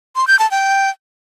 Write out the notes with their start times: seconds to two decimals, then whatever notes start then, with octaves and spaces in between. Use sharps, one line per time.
0.16 C6
0.28 G6
0.39 A5
0.51 G5